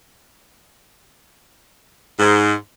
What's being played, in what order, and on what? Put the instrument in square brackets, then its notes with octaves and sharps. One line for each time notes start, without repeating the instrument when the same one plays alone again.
[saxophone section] G#2